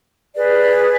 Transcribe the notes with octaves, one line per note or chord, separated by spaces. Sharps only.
G#4 B4 D5